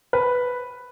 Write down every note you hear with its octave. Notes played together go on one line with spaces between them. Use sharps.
B4